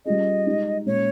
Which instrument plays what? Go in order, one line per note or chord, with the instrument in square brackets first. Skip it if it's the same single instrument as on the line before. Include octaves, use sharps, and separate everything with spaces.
[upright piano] G3 C#4 F4 G#4 [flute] D#5
[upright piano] G#3 D#4 G4
[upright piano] A#2 G#3 C#4 [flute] C#5